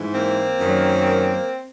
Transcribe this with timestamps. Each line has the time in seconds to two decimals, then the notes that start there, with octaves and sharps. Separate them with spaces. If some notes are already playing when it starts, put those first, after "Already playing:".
Already playing: G#2 E3
0.14 A#3 C4
0.60 F#2 D#3 F#3